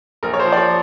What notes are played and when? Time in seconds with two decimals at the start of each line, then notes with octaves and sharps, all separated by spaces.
0.23 A#1 A#4
0.33 C#5
0.39 C5
0.45 F3
0.52 D5
0.57 C#5